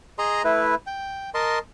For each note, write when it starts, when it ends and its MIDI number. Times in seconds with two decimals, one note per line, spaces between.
0.19 0.42 68
0.19 0.42 75
0.19 0.42 82
0.19 0.42 84
0.44 0.75 57
0.44 0.75 64
0.44 0.75 71
0.87 1.30 79
1.34 1.59 70
1.34 1.59 75
1.34 1.59 81
1.34 1.59 84